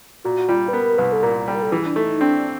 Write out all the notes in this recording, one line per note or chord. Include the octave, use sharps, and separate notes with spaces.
A#2 F#4
G3 F4
B4
B3 A#4
C2 B4
A4
A#2 A#4
G3 A4
A#4
A4
E3 G#4
D4
A3 D#4
C4 D4